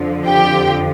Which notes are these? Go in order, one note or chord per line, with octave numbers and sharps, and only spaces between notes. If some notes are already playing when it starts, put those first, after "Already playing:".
Already playing: F2 D3 F3
G4 G5